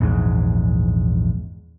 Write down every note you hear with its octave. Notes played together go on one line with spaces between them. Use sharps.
A#1 E2 G#2